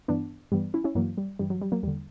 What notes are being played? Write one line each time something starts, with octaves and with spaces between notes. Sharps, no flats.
G2 E3 B3 D4
G2 E3 G3 B3
C#4 E4
C#4 E4
G2 E3 F#3 A#3
G3
G2 E3 G3
F#3
G3
F#3 A#3
E2 D3 G3